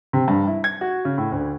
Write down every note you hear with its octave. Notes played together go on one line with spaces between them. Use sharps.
C3
G2
E4
G#6
F#4
C#3
A2
D2